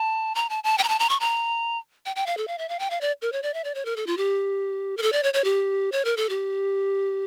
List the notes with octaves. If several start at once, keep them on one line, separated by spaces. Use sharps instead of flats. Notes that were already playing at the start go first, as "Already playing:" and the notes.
Already playing: A5
A#5
A5
A5
G5
A#5
A5
A#5
C#6
A#5
G5
G5
F5
A4
F5
E5
F5
G5
F5
D5
A#4
C#5
D5
E5
D5
C#5
A#4
A4
F4
G4
A#4
A4
D5
C#5
C#5
G4
C#5
A#4
A4
G4